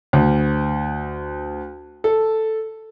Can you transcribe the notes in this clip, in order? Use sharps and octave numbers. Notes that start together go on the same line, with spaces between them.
D2
A4